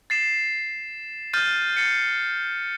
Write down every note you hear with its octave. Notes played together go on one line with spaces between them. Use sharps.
A6 C7 E7
F6 G6 A6 D#7
A6 C7 C#7